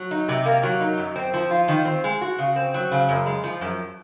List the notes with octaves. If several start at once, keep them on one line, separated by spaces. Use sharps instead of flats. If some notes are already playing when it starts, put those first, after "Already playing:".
Already playing: F#3
D#4
C3
A#3
F#3
D#4
F#2
C4
F3
F4
D#3
C4
G#3
F#4
C#3
C4
F#3
C#3
F#2
G#3
F3
F#2